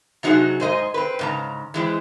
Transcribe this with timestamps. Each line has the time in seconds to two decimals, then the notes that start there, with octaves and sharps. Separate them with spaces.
0.23 C3 F#3 D#4 E4 F#4 G#4
0.60 G#2 C5 D#5 G#5
0.94 C4 B4
1.19 G#2 C#3 A#5
1.74 E3 G#3 C4